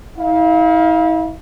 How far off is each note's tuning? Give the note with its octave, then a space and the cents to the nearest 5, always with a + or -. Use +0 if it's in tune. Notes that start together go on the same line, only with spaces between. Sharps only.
E4 -40 F5 +0